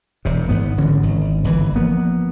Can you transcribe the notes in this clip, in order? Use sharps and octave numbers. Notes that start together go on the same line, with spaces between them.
E1 C3
G#1 G#2 B3
D2 D3 E3 C#4
G#1
G1 E3
F3 A#3 B3